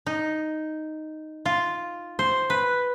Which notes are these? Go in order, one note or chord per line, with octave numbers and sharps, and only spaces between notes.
D#4
F4
C5
B4